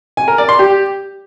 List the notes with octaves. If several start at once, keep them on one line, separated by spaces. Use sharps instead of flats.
G#5
A#4
D5
C6
G4